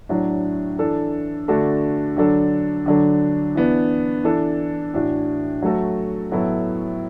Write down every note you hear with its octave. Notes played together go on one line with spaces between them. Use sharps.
A2 F#3 D4
E3 D4 A4
D3 A3 D4 F#4 A4
D3 F#3 D4 A4
D3 F#3 D4 A4
E3 B3 D4
E3 D4 A4
A2 E3 D4 F#4
F#3 A3 F#4 A4
A2 F#3 B3 E4 A4